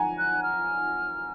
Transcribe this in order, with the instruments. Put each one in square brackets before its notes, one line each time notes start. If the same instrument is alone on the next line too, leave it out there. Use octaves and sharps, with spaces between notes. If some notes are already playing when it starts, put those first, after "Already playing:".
Already playing: [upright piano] F#5 G#5 A#5
[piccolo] F#6
F6